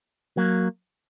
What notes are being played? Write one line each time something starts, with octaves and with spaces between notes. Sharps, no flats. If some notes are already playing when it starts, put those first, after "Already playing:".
F#3 A#3